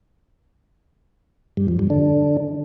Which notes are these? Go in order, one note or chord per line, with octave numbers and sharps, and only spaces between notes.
G2
F2
G2
D3